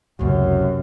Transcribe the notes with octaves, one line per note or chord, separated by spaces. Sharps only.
F#1 C#2 F#2 C3